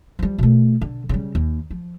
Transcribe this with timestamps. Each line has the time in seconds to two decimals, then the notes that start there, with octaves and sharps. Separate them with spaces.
0.19 F3 G3
0.38 B2 A3
0.81 D3
1.09 C#3 G3
1.35 D#2
1.71 F3